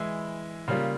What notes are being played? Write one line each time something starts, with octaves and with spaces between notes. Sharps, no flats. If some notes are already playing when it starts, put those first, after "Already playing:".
Already playing: E3 G#3 E4
C#3 G3 A#3 F4